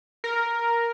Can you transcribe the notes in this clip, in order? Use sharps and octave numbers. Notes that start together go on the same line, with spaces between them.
A#4